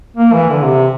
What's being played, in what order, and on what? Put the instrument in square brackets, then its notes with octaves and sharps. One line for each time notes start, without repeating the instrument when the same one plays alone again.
[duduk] A#3
E3
D3
C3